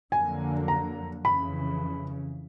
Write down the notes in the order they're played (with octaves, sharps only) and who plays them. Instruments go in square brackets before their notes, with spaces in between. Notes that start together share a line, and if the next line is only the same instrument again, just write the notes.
[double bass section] F2 D3 F#3 A#3 [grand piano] G#5
[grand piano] A#5
[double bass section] F2 C#3 E3 [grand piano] B5